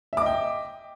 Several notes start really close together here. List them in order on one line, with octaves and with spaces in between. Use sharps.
E5 D6 D#5 G5